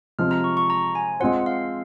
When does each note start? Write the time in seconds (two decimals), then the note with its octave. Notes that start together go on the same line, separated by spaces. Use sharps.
0.19 C3 F3 G#3 F6
0.31 A#5
0.44 C#6
0.57 C#6
0.70 A#5
0.95 G#5
1.20 G#3 C4 F4 C5 F#5
1.46 F5